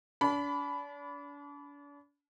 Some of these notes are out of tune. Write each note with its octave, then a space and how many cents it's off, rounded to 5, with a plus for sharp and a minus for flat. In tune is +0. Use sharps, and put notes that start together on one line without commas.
D4 -40 B5 +5